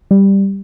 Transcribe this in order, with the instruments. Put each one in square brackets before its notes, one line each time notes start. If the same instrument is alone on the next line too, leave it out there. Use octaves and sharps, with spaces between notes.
[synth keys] G3